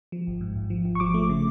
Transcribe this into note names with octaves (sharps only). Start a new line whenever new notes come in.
F3
G#1
G#2
G#1
F3
G#1
C#6
F3 D6
A3
C#3